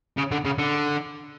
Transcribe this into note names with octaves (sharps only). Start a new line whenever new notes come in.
C#3
D3
C#3
D3